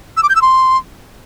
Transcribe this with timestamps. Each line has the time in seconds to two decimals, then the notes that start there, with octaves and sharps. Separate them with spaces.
0.17 E6
0.23 D6
0.29 G6
0.35 E6
0.42 C6